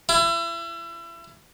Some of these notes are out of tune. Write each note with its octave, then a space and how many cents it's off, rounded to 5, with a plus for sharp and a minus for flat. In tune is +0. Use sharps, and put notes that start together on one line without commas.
E4 +35